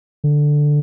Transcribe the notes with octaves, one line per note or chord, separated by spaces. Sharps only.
D3